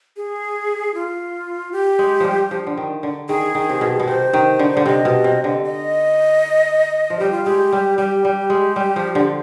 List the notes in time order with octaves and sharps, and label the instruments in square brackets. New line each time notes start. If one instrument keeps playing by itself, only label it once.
[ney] G#4
F4
G4
[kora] G#3
F3 G3
F3
D3
D#3
D3
[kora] D#3 [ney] G#4
[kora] D#3
C3
B2
B2
[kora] C3 [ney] C5
[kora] D#3
D3
D3
[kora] C3 [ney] D#5
[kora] B2
C3
D3
[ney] D#5
[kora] F3
[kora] G3 [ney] G4
[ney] F4
[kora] G#3 [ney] G4
[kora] G3
[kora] G3 [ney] G4
[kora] G3
G#3
G3
F3
D3